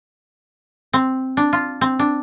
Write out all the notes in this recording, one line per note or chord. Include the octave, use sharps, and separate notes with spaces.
C4
D4
F4
C4
D4